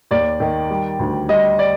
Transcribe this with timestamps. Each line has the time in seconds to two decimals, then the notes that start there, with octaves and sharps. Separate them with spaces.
0.11 D#2 D5
0.40 D#3
0.70 G3
0.99 D2
1.29 G3 D#5
1.59 D5